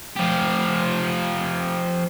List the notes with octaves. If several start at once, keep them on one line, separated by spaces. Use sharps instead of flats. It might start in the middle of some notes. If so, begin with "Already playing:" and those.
F3 G4